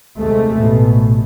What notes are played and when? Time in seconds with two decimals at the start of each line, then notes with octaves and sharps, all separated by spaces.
0.17 D#2 C3 G#3 A3
0.58 A1 B2